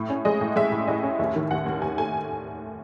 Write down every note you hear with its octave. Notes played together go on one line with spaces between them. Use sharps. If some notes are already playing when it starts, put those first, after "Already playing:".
Already playing: A2
C#4
G#3 D#5
A2
G#3 E5
A2
A2 D#5
C#4
D#2 E5
D#3
D#2 F#5
D#2
D#2 G#5
A3 G#5